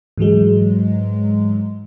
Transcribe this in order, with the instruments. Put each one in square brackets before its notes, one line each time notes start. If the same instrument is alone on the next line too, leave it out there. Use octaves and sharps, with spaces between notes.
[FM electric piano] G#2 E3 F#3 G#3